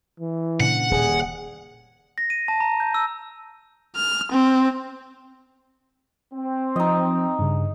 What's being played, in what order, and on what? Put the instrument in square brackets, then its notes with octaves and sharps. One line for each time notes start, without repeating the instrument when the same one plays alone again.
[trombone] E3
[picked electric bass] A#2 C#3 D4 [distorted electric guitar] F#5
[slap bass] D#1 [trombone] G#4
[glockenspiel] A#6
D#7
A5
A#5
G6
E6
[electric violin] F6
C4
[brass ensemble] C4
[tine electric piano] F3 [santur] D#4 D#5
[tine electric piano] G2 C#3